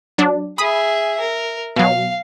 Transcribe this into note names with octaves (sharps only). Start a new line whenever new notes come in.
F#3 D4
G#4 E5 B5 D#6
A#4
B2 F#3 F5